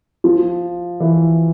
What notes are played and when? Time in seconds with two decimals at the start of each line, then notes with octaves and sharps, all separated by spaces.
0.24 F3
1.00 E3